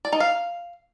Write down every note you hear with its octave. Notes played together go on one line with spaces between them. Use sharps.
D5
D#4
F5